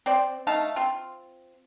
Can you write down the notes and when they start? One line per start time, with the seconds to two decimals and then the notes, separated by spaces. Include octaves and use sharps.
0.06 C4 C5 D5
0.47 A3 D#4 F5 A5
0.76 C4 F4